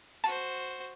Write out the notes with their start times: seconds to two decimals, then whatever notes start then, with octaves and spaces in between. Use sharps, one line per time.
0.24 F#4 C5 A5